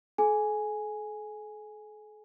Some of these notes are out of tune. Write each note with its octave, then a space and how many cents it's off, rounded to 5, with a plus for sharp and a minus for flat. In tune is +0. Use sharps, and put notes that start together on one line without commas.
A4 -45 G#5 +0